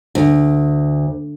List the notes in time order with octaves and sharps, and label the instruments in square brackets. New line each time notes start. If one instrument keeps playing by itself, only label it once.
[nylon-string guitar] D2